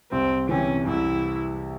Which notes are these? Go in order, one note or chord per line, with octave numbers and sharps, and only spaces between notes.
C2 C4
C3 E3 C#4
C2 E4